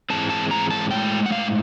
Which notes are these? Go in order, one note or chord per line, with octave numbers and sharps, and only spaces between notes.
G#2 E3 G#3 C4 A5
A5
A#5
A5
A2 E3 G#3 G5
F#5
F5